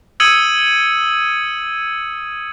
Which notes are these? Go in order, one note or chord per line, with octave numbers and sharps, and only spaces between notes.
D#6 E6 G#6 C#7 D#7 F#7